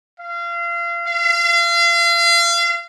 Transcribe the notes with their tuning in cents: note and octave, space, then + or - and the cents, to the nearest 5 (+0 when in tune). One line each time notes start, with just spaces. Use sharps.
F5 -30
F5 -35